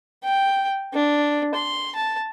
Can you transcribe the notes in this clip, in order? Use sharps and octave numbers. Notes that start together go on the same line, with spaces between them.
G5
D4
C6
A5